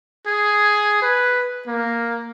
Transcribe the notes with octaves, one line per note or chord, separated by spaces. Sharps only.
G#4
B4
A#3